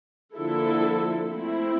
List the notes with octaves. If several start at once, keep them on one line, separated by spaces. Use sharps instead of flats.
D3 F3 A#3 E4 A4
A3 C4 E4